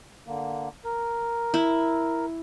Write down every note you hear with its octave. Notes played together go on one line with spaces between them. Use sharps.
D3 A#3
A#4
E4